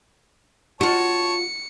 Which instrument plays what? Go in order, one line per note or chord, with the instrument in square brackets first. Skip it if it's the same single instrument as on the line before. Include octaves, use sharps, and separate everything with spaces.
[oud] F4 F#4 [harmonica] C#5 A5 [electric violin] C#7